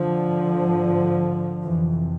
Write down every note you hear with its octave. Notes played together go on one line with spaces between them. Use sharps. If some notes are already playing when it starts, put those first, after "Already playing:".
Already playing: D3 F3
G#2
F2 C3 E3